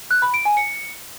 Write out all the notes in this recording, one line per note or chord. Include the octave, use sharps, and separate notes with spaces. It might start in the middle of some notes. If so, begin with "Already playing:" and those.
F#6
B5
D7
G#5
C#7